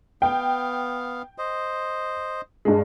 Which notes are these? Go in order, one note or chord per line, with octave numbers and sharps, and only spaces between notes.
B3 F5 G5
C5 D#5
G2 G#3